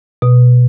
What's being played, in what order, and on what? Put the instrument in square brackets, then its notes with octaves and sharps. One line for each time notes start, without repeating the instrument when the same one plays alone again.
[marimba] B2